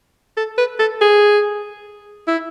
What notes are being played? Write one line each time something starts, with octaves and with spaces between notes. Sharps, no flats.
A4
B4
A4
G#4
E4